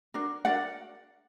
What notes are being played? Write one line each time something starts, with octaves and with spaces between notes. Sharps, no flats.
D4 F#4 A#4
D4 F#4 A#4 D5 F#5